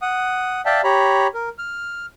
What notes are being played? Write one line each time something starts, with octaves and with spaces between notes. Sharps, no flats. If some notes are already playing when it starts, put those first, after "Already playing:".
F#5 D#6
D5 E5 F5 G5 A5
G4 C#5 A#5 B5
A#4
F6